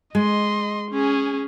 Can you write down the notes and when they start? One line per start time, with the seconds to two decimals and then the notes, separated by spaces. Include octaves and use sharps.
0.15 G#3 D#5 C6
0.91 C#4 G#4